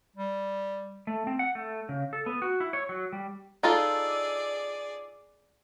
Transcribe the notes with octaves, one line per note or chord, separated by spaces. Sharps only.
G3
A3
C4
F#5
A3
C#3
A4
B3
F#4
E4
C#5
F#3
G3
D#4 F4 G#4 A4 D5